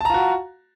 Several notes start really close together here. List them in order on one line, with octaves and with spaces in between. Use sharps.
A5 A#5 F4 F#4